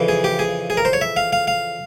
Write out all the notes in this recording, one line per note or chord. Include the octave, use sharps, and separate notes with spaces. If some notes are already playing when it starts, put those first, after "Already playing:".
Already playing: F2 C#3 E3
G#4
G4
G#4
G#4
A#4
C5
C#5
E5
F5
F5
F5